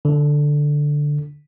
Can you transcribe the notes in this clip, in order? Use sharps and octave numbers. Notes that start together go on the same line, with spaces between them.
D3